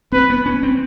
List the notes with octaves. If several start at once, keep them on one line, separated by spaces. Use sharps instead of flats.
C4 B4
B3
C#4
C4